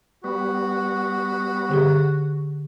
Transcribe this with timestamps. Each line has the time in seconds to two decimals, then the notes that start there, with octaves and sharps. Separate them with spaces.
0.24 G3 B3 F#4
1.69 D3 G4 G#4